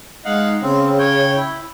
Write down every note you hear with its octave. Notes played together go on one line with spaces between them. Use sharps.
G#3 D#4 F5 F#5
C#3 C4
C#5 G5
E4